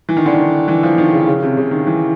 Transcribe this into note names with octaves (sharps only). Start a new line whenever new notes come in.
E3
D#3
D3
D#3
E3
F3
D#3
C#3
C#3
C3
C#3
D#3
E3